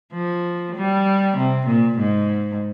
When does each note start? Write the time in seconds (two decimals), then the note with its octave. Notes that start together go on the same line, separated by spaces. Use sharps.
0.13 F3
0.76 G3
1.37 C3
1.67 A#2
1.99 G#2